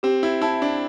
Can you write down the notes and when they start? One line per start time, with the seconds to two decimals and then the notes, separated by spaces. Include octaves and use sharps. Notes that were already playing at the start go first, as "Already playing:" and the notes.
0.03 C4 G4
0.23 E4
0.42 E4 E5 A5
0.62 D4